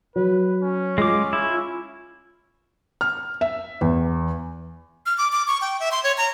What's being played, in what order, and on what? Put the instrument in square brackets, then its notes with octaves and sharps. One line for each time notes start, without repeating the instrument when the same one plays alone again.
[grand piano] F#3 [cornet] B4
[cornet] C#4
[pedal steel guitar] G#3 D6 [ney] F4
[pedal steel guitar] E4
[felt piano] F6
E5
E2
[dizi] F6
D6
D6
C#6
G5
E5
C6
C#5
A#5